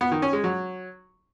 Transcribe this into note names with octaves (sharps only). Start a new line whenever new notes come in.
B3
D#3
C#4
G#3
F#3